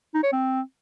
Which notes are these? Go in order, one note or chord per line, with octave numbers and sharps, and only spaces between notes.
D#4
C#5
C4